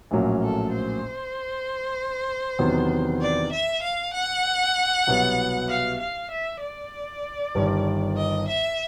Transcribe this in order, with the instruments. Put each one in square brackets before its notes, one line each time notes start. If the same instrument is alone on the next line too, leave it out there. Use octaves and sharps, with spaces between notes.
[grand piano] A#1 A2 F#3 A#3 C#4
[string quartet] A4
C5
[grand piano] E2 C3 D#3 F#3 B3
[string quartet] D5
E5
F5
F#5
[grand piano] C2 B2 F#3 B3
[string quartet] F5
F5
E5
D5
[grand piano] G1 G2 D#3
[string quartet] D#5
E5